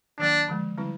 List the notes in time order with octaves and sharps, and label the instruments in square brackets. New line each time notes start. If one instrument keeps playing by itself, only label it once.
[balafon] D#3 F#3 A#3 [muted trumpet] D4
[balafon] D3 F3 G#3
D3 G3 C4 E4